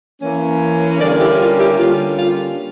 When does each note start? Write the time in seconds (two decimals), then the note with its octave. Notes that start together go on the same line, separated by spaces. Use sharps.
0.22 E3 A#3 C#4
1.00 D3 G3 A#3 C#4 A#4 D5
1.20 E4 G4
1.40 F4
1.59 E4 G4
1.78 D3 G3 A#3 C#4 F4
2.18 F4